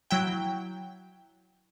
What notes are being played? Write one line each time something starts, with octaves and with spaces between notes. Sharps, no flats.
F#3 E4 G5